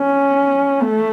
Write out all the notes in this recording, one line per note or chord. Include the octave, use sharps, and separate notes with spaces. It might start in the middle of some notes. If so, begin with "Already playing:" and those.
Already playing: C#4
A3